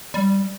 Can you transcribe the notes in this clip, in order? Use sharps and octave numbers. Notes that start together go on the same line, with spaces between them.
G3